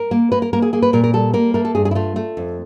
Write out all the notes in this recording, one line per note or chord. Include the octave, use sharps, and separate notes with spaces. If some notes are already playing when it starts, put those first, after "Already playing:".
Already playing: A#4
A#3
A#3 B4
A#4
A#3 A#4
G#4
A#3 G#4
B4
A#2 A#4
A#4
G3 A4
A#3 A#4
A3 A#4
A4
G2 G#4
G#4
E4
A3 F4
A3
F2